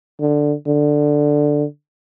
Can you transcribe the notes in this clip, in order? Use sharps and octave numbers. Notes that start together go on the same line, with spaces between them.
D3
D3